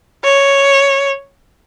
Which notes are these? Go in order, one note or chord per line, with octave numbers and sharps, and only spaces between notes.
C#5